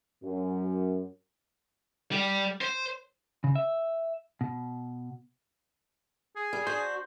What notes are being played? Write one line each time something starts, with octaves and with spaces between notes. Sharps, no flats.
F#2
G3
C5
C#3
E5
B2
G#4
G3
D4 F#4 C5